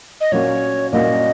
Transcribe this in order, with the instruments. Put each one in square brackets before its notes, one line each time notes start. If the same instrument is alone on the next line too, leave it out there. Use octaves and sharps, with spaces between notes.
[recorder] D#5
[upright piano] A#2 F#3 A#3 C#4 F#4 [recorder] C#5
[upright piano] A#2 F#3 A#3 C#4 F#4 [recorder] D#5